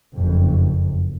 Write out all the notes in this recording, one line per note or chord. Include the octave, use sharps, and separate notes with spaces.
F#1 F2